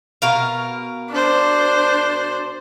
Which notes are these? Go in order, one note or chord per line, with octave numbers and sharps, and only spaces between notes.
B2 A#4 F5
D4 C5